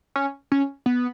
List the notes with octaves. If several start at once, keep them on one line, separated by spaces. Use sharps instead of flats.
C#4
C#4
B3